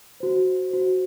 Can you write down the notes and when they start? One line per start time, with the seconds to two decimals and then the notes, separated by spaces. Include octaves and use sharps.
0.20 F#4 C5
0.71 F#4 C5